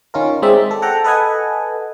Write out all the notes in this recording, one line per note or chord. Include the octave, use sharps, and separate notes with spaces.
D#3 C#4 F4 A#4
G#3 C4 D#4 D5 E5
A4
A4 F#5 G5 A#5
A4 B4 D#5 F#5 G#5